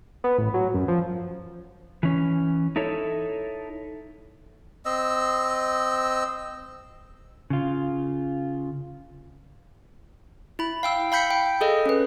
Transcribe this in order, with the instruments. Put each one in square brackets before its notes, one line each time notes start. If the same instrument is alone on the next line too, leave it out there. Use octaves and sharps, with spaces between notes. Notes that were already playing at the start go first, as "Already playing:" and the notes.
[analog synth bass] B3
A1
F#3
F#2
F3
[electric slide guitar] E3 C#4
D#4 E4 A4 C#5
[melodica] C4 D#5 E6
[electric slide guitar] C#3 F4
[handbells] E4 B5
F5 G5 E6
F5 B5 G6 B6 C#7
G5
G#4 A4 D#5
C#4 B4